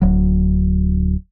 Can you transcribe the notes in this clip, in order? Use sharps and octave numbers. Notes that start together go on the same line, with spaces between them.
D1 F#3